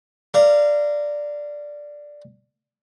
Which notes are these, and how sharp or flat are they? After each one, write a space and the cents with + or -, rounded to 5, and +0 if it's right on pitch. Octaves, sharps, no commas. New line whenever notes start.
A#4 -10 D5 +0 F5 -25